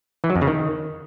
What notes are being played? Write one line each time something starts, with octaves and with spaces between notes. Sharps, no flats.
E3
F#3
F2
C#3
D#3